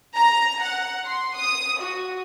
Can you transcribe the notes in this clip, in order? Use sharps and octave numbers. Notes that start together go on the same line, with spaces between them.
A#5
F#5
C6
D#6
F#4